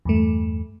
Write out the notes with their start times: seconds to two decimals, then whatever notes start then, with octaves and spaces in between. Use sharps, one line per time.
0.05 E2 G2 A3